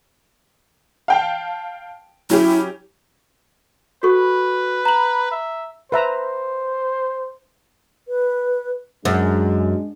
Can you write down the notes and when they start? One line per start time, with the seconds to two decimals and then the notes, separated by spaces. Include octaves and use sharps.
1.08 F5 G5 A5
2.30 F#3 C#4 E4 G4
4.03 F#4 A4 B4 C#6
4.85 A#5 F#7
5.31 E5
5.92 B4 C5 E5 A#5
8.08 B4
9.05 F#2 G#3 D4